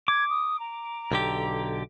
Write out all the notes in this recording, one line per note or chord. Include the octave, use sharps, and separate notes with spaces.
D6 G#6
D#6
A#5
B1 D3 G4